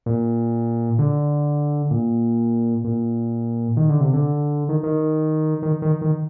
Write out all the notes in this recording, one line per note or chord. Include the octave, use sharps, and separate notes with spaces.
A#2
D3
A#2
A#2
D#3
D3
C3
D3
D#3
D#3
D#3
D#3
D#3